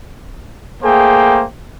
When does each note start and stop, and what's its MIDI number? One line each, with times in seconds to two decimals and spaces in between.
0.83 1.44 57
0.83 1.44 58
0.83 1.44 68
0.83 1.44 72
0.83 1.44 79